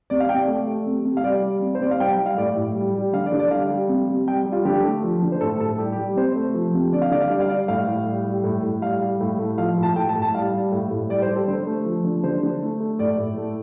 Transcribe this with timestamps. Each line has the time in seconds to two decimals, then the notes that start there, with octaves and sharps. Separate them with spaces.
0.10 C3 D5
0.20 F5
0.29 C3 G5
0.39 D5
0.48 A3
0.67 A3
0.86 C3
1.05 C3
1.17 F5
1.24 G3 D5
1.43 G3
1.61 C3
1.75 C5
1.80 C3 D5
1.91 F5
2.00 G3 G5
2.13 G5
2.19 G3
2.26 F5
2.37 A2 D5
2.56 A2
2.75 G3
2.95 G3
3.13 D3 F5
3.26 D5
3.32 D3
3.39 D5
3.51 G3 F5
3.71 G3
3.89 C3
4.08 C3
4.27 G3 G5
4.46 G3
4.52 F4
4.65 D3 G4
4.85 A3
5.03 F3
5.22 D3
5.32 C5
5.41 A2 A4
5.60 A2 A4
5.78 G3 G4
5.92 G4
5.98 G3
6.16 C3 C5
6.36 A3
6.54 F3
6.74 C3
6.92 D3 D5
7.02 F5
7.11 D3 D5
7.20 F5
7.30 G3 D5
7.41 F5
7.49 G3 D5
7.68 A2 F5
7.87 A2
8.06 G3
8.25 G3
8.44 A2
8.63 A2
8.82 G3 F5
9.01 G3
9.20 A2
9.39 A3
9.58 F3 F5
9.78 A2
9.83 A5
9.96 A2 G5
10.09 A5
10.16 A2
10.22 A5
10.34 G3 F5
10.53 G3
10.72 A2
10.91 A2
11.10 G3 D5
11.22 C5
11.28 G3
11.35 A4
11.48 D3 C5
11.67 A3
11.85 F3
12.04 D3
12.24 D3 C5
12.43 D3
12.62 A3
12.80 A3
12.99 A2 D5
13.18 A2
13.38 A3